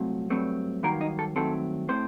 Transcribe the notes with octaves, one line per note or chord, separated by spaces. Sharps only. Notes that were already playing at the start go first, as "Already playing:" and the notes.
Already playing: C2 A#2 F#3 A3 C4
G2 F#3 A3 C4
G2 D#3 F#3 A#3 A#4
D#4
A4
G2 D#3 F#3 A3 C4 A4
A2 A3 C4 C5